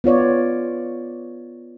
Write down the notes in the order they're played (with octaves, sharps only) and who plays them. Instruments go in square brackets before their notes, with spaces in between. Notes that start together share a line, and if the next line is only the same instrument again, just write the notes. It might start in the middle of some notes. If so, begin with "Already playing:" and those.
[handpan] B3 F4 C#5 D5